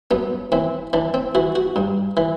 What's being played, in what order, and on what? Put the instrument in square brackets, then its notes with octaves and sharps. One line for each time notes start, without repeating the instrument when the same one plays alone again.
[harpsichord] F#2 B3
E3 C4
E3 D4
C4
E3 F#4
F#4
G2
E3